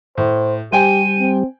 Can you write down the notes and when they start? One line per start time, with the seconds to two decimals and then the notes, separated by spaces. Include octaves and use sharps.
0.18 A2 C5
0.72 G3 G4 C5 G5 G#5 D#7
1.20 C4